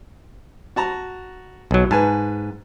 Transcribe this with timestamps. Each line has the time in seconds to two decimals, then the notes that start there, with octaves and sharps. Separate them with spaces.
0.76 F#4 A5 A#5
1.71 B1 F#3
1.91 G#2 B4 G#5 A5